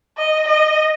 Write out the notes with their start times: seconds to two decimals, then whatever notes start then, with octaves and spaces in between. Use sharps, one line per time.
0.18 D#5
0.48 D#5